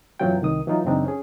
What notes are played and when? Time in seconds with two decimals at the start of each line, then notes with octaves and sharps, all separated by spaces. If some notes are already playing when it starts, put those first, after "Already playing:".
0.20 F#2 B2 E3 F#3 F4 G5
0.42 C2 D#3 D#6
0.67 E3 F#3 D#4 F4
0.85 F#2 C#3 E3 C4 D4 D#4
1.04 C#4 G#4